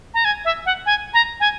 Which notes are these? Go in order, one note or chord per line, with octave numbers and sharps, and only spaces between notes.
A#5
G#5
E5
F#5
G#5
A#5
G#5